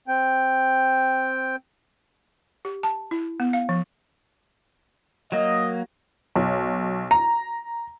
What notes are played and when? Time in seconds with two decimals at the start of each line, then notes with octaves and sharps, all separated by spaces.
0.08 C4 G5
2.65 G4
2.83 A5
3.11 E4
3.40 B3
3.53 F5
3.69 F3
5.32 F#3 A#3 D#5
6.36 B1
7.11 A#5